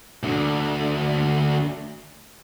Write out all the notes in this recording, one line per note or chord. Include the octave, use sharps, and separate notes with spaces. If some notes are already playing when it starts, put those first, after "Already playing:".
D2 D3